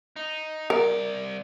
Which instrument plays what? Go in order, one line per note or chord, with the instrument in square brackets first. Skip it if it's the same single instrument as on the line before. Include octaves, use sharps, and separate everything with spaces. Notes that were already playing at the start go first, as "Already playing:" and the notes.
[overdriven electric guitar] D#4
[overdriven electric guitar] C2 D5 [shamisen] A#4